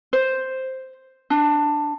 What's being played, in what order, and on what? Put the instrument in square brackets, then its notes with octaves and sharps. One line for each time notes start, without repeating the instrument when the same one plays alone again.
[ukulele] C5
D4